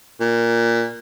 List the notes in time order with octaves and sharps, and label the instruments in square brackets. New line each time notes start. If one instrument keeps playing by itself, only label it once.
[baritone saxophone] A#2